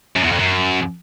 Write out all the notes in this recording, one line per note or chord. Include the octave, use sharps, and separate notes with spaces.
F#2
E2
F2
F#2